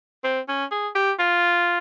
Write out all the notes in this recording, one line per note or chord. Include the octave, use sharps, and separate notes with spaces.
C4
C#4
G#4
G4
F4